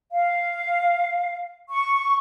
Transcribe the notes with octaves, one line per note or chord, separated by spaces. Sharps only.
F5
C#6